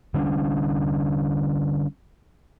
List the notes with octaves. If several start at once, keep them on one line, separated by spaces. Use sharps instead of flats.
D3 G3 C#4 D4